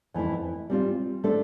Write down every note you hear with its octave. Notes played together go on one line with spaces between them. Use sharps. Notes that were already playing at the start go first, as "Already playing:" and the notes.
F2 E3 A3 E4
G3 C4 F4
A3 D4 A4 C5